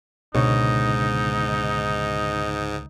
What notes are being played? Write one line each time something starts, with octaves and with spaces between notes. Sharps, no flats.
C#2 G#2 B2 D3 D#4 C#5